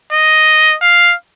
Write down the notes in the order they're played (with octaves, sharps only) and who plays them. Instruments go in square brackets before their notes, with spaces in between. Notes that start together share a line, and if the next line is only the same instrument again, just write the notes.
[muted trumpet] D#5
F5